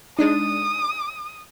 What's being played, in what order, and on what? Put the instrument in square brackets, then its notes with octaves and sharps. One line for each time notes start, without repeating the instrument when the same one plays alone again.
[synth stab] G#3 D4 D#4 [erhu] D#6